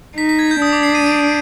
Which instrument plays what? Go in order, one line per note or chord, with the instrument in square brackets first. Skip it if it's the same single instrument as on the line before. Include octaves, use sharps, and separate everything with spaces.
[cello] D#4 [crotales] B6
[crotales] B6
G#6
G6
[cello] D4 [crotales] D#6
[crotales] D6
C7
D#7
D7